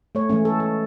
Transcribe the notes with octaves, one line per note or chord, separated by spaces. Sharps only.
A3 C#5
E3 G#3 A3 C#4
A4
A4